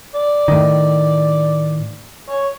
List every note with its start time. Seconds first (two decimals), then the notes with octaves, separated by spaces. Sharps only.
0.14 D5
0.48 A2 D#3
2.28 C#5